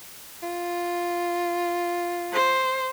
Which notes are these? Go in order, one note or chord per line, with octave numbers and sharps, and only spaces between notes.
F4
C5